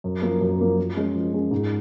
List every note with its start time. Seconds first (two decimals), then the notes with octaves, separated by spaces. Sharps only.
0.04 F#2
0.22 F3 A#3
0.41 F#2
0.59 F3 A#3
0.77 F3
0.97 G#3 C#4 G#4
1.15 F3
1.33 G#3 C#4 G#4
1.51 G#2